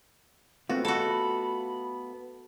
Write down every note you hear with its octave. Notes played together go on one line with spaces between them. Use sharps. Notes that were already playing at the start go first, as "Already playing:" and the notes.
A3 B3 C4 F4 F#4
F#4 A4 B5